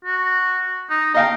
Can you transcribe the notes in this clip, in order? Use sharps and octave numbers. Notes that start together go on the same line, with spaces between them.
F#4
D#4
D#5 F5 G5 A#5